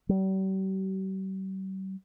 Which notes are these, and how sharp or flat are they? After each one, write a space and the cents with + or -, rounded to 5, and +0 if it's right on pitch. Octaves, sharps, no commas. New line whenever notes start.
G3 -45